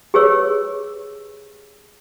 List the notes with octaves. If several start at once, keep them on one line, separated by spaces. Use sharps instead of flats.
G4 G#4 B4 C#5 E6